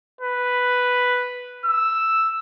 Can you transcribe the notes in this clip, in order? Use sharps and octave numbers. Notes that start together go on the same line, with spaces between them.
B4
E6